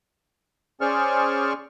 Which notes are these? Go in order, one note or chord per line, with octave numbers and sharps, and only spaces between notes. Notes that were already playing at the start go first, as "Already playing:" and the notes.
C#4 G#4 C5 D5 C#6 F6